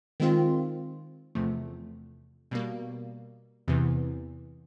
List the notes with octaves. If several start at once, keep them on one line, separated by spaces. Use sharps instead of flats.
D#3 G#3 C4 F4
E2 C3 F3 A3
B2 G3 A#3
E2 C3 E3